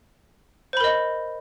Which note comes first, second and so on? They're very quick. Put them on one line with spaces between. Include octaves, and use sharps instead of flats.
C5 B5 A#4 D#5